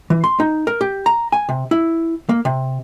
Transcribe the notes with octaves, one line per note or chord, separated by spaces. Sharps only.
E3
C6
D#4
A#4
G4
A#5
G#5
C3
E4
A#3
C3